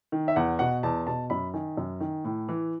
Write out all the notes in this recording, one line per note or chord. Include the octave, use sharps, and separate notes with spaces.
D#3
E5
E2 F#5
B2 F#5
E2 A5
B2 A5
F#2 B5
D#3 G#5
F#2
D#3
A2
E3